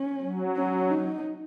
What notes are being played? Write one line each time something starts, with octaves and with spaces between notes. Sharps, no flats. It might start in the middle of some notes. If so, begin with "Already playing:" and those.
Already playing: C#4
F#3
C#4
D#4